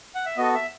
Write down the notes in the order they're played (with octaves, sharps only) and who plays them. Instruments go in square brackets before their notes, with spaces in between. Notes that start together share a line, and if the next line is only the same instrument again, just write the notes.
[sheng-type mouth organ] F#5
E5
B3 F#4 A4 D#5
E5